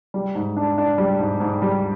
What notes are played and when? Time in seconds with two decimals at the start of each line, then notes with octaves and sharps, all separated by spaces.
0.14 G3
0.35 G#2
0.57 D4
0.78 D4
0.98 G3
1.19 G#2
1.40 G#2
1.62 G3